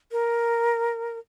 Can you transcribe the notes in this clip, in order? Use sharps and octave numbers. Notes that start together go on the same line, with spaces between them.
A#4